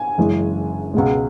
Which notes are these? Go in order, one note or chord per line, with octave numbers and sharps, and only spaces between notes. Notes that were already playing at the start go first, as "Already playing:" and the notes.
Already playing: G#5
F#1 F#2 E3 G#3
C#2 B2 G#3